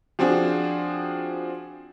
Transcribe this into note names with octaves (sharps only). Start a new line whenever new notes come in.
F3 C4 D4 F#4 G#4